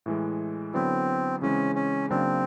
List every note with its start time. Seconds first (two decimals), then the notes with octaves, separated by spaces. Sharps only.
0.06 A2 E3 G#3
0.74 D3 F#3 B3 C4 E4
1.42 C#3 E3 G#3 C4 C#4
1.75 C#4
2.10 C#3 F#3 A#3 C4 D4